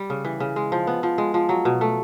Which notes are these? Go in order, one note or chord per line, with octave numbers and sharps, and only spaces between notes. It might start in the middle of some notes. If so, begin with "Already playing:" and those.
Already playing: G3
C#3
E3
C#3
G#3
F3
B3
F3
G#3
F3
F#3
B2
A3